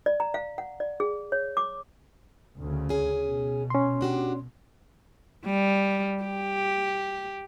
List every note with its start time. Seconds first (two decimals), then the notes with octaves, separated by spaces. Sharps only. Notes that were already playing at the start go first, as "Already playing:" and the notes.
0.06 D5
0.20 A#5
0.34 F5
0.58 F#5
0.80 D5
1.00 G#4
1.32 C#5
1.57 D6
2.59 D2 C#3
2.89 C#4 G#4
3.23 B2
3.70 C#4 C6
4.01 D4 F#4 G4
5.46 G3
6.24 G4